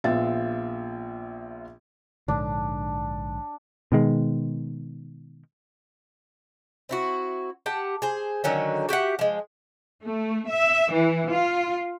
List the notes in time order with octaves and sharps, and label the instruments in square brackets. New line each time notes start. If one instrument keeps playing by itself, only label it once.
[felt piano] A#1 B3 F4 E5 A6
[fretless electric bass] A#1 G#2 D3 [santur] D4
[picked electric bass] B2 D#3 G#3
[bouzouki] C4 E4 F#4
G4 F#5 A5
G#4 C5
D3 D#3 F#3 C#4
F#4 G4 E5 F#5
F3 G#3
[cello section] A3
E5
E3
F4